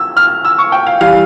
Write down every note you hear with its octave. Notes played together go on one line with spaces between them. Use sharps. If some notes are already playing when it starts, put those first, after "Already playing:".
Already playing: E6
F6
E6
C#6
G5
F5
E3 G3 F5